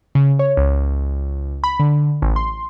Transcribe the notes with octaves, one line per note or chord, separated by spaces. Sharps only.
C#3
C#5
C#2
B5
D3
A1
C6